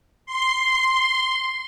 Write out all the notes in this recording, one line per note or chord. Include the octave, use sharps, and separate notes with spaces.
C6